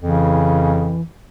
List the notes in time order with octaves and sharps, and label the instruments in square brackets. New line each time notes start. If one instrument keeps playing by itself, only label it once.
[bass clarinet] F2 [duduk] C#3 [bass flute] E3